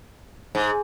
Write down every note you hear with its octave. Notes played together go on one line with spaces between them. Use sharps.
G#2